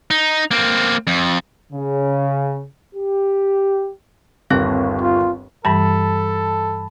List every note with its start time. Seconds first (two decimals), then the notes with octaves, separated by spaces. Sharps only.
0.11 D#4
0.51 A#3 C4
1.07 F2
1.73 C#3
2.95 G4
4.50 G1 D#2 C4 F5
5.02 F4
5.65 G2 E3 G3 A4 A5 B5